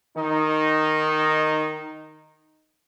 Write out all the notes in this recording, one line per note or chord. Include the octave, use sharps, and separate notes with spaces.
D#3 D#4